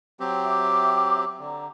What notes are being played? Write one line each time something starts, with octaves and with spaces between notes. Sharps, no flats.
F#3 C4 G4
E5 D6
D3 D5 A#5